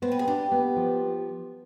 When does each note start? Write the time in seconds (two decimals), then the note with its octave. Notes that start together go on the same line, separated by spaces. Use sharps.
0.02 B3 C4
0.12 B4
0.19 G#4
0.27 D4 G4
0.52 B3
0.76 F3